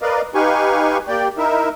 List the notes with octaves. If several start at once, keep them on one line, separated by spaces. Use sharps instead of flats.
A#4 B4 D5 D#5 F5
D#4 G4 B4 F5 G#5 C#6
A#3 G4 D5 G5
D#4 E4 A#4 E5